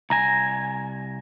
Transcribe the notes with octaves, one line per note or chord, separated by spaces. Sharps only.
C2 G#5 A#5 A#6